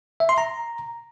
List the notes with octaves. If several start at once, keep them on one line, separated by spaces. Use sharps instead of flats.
E5
C6
A#5